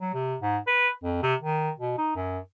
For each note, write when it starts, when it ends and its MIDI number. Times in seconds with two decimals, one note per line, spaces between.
0.01 0.12 54
0.14 0.35 48
0.42 0.58 44
0.67 0.90 71
1.04 1.21 41
1.23 1.34 48
1.42 1.70 51
1.79 1.95 47
1.98 2.11 63
2.16 2.39 42